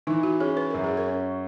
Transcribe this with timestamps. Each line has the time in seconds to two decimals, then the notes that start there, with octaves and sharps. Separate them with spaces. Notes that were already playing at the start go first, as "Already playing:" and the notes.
0.07 E3 D#4
0.23 F#4
0.40 C#4 G#4
0.57 B4
0.70 F#2 A#4
0.84 G#4
0.97 A#4
1.07 C#4